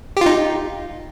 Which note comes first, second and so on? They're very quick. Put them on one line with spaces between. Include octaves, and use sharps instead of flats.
G4 F4 D#4